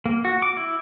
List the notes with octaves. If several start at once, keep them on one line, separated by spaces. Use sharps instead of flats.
A#3
F#4
D6
E4